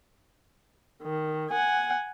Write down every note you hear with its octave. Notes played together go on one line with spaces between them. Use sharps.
D#3
F#5 G#5